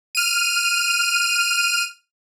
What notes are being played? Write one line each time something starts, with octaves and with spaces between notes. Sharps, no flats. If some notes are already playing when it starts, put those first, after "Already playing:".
F6 D#7